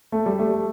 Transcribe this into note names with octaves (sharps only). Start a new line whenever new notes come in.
A3
G3
A3